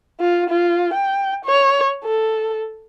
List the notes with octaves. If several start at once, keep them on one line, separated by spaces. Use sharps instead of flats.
F4
F4
G5
C#5
A4